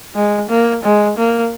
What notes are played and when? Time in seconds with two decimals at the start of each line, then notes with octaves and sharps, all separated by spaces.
0.15 G#3
0.49 A#3
0.83 G#3
1.17 A#3